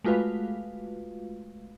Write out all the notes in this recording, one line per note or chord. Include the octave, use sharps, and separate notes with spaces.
G#3 A3 F4 F#4 B4 F5